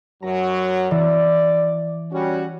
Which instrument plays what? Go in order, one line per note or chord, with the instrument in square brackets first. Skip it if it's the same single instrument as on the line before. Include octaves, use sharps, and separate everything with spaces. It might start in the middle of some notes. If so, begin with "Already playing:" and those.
[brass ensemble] F#2 F#3 [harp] A#5
[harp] E3 [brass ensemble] D5
[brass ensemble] G3 C#4 F#4